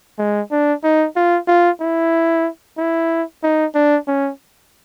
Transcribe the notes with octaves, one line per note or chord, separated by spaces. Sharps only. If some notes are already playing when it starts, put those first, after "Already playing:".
G#3
D4
D#4
F4
F4
E4
E4
D#4
D4
C#4